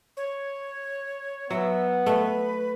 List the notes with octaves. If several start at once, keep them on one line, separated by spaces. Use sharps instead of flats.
C#5
F#3 B3 E5
A3 B4